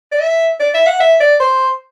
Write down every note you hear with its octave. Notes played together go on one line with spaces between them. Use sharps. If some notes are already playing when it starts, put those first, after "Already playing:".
D5
E5
D5
E5
F#5
E5
D5
C5